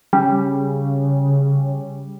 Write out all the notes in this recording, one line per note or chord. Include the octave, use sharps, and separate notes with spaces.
C#3 G3